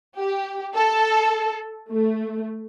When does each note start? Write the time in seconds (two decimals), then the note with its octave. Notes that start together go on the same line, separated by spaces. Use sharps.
0.18 G4
0.75 A4
1.92 A3